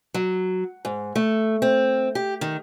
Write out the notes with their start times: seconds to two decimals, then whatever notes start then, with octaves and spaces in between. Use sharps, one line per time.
0.14 F#3
0.85 G#2
1.16 A3
1.62 C4
2.15 G4
2.41 D#3